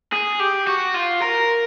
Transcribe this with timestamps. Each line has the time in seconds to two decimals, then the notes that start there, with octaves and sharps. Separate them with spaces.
0.12 G#4
0.40 G4
0.67 F#4
0.94 F4
1.21 A#4